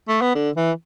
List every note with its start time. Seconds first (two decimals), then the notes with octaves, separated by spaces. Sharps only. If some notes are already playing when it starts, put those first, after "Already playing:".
0.08 A3
0.21 B3
0.35 D3
0.56 E3